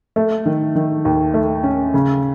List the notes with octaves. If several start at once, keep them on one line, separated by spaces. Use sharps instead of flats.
A3
D#3
D#3
D#2
A3
C#4
C#3